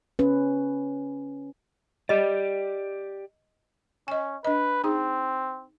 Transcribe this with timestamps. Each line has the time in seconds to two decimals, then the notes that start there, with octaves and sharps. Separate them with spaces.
0.19 C#4 B4
2.09 G4 D5 D#5
4.08 C#4 D#5 G#5
4.45 D4 B4 D#5
4.84 C4 D#4 G#4